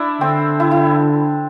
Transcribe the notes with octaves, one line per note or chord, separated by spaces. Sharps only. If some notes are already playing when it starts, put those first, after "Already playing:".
Already playing: D4 E4
D3 C4
E4
E4